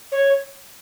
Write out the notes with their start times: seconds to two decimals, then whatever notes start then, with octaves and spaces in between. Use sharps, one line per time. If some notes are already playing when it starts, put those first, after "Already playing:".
0.12 C#5